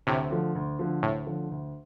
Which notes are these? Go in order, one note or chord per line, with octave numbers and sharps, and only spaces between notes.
D2 A2 C3
D3 F3 A3
D2
D3 F3 A3
D2 A2
D3 F3 A3
D2